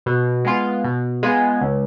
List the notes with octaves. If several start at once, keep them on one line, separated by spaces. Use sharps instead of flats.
B2
G#3 B3 F4
B2
G#3 B3 F4
C#2